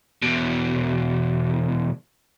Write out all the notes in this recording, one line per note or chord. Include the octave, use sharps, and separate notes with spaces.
E2 B2